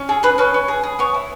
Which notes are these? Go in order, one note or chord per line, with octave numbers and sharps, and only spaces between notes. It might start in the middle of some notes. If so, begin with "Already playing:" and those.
Already playing: C#4
G#4 A4
G#4 B4
C#4 B4
C#4
G#4
G#4
B3 C#5
E4